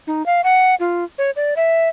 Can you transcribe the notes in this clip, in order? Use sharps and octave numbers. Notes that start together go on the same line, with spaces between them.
D#4
F5
F#5
F4
C#5
D5
E5